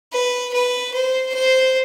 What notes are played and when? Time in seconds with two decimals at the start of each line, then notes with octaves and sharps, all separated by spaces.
0.12 B4
0.53 B4
0.94 C5
1.35 C5